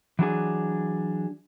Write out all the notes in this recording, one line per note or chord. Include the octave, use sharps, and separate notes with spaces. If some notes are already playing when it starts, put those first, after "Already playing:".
E3 F#3 D4 G#4